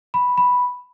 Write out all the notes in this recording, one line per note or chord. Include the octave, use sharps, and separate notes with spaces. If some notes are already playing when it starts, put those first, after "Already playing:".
B5
B5